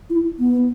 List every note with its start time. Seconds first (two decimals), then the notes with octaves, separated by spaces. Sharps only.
0.10 E4
0.39 B3